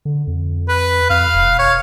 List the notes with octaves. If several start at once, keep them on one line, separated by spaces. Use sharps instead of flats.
D3
F2
B4
F2 F5
E1
C#5